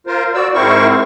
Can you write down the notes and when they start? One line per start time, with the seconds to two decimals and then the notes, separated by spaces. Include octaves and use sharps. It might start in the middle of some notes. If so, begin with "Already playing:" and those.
0.07 F4 A#4 C5
0.34 F#4 D5 E6
0.54 G#2 C4 E4 A#4 C5 C#6